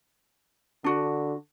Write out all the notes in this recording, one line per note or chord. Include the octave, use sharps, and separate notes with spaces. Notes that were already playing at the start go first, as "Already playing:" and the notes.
D3 D4 F#4